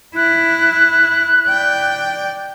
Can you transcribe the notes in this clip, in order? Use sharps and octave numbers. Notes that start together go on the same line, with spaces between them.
E4 F#6
D5 G5